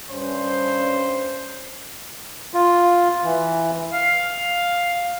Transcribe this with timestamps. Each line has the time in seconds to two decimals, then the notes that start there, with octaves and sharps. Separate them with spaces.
0.10 G2 C#4 C5
2.54 F4
3.24 E3
3.93 F5